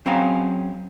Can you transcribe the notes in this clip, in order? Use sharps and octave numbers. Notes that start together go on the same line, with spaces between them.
F#3 C4 C#4 G#4 F5 A#5